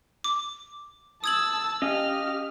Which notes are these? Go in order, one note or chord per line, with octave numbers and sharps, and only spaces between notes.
D6
A5 D#6 E6 G#6 F#7
C#4 G4 D#5 F5 F6